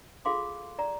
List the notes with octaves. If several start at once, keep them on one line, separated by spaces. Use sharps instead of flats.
F4 G#4 A4 F5 C6 D6
D5 A#5